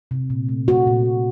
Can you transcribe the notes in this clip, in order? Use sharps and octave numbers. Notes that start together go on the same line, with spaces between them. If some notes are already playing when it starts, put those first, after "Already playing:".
C3
A#2
A3
A3 F#4
A#2
A#2